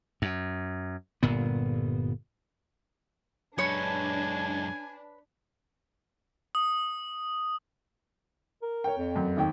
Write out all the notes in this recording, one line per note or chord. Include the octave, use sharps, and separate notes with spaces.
F#2
G1 A#2 B3
F#2 G#3 D4 B4 C#5 G#5 C#6
D#6
A#4
C#5 G5
F2
F#2
G#1 D#2 G5